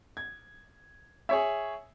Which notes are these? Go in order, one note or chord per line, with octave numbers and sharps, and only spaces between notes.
G#6
G#4 C#5 E5